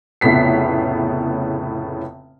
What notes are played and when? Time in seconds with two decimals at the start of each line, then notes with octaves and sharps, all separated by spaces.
0.21 F1 A2 C#3 B3 B6 C7